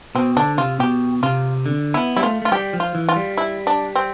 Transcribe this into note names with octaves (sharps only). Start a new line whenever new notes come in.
B2 C4
D3 D4
C3 F4
B2 G4
C3 F4
D3
B3 E4
G3 E4
A3 F4
A3 F4
G3 G4
F3
F4
E3
F4
G3
E4
D4
C4